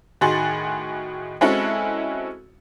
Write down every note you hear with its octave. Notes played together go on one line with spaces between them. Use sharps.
A2 D#3 F#4 G#4 C6 A6
G#3 C4 C#4 E4 F#4 A4